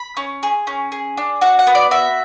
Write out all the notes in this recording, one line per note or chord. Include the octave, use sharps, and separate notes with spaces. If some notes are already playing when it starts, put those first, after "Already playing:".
Already playing: B5
C#4
G#4
C#4
G#4
D4
F#4 F#5
F#5
B3
D5
F#4 E5